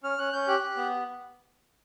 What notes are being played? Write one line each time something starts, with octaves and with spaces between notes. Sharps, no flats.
C#4 F6
C#4 F#6
C#4 G6
G4 F#6
G4
B3